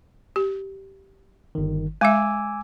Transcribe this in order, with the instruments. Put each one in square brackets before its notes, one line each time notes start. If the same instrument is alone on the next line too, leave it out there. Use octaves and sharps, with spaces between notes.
[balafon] G4
[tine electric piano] G1 D#3
[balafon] G#3 E5 [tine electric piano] G#5 D6 E6